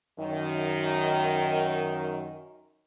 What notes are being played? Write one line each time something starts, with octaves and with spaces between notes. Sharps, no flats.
F#2 D#3